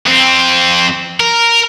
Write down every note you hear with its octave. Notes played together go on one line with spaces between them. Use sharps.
F2 C4
A#4